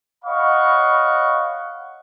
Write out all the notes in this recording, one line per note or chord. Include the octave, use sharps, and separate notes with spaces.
C#5 D#5 F5 F#5 B5 C#6